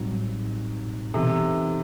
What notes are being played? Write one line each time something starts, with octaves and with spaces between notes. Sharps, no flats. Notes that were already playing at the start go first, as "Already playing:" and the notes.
Already playing: A1 A2 F#3 G3 C4 D#4
C3 E3 B3 D#4 A4